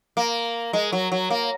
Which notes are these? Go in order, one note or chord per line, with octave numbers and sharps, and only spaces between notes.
A#3
G#3
F#3
F#3
A#3